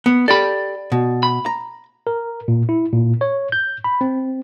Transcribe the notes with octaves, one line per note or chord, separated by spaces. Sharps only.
B3
G4 A4 D5 B5
B2
B5
A#5
A#4
A#2
E4
A#2
C#5
G6
B5
C4